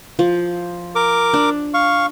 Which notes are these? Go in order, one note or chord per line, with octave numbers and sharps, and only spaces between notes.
F3
A#4 D6
D4
F5 C#6